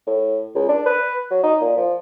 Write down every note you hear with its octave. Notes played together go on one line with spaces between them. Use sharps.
A2
C#2
D4
B4
F#3
D#4
A#2
F3